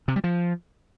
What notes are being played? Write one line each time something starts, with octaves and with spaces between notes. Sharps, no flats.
C3
G3
F3